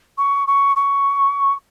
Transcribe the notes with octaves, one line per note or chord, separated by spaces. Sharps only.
C#6
C#6
C#6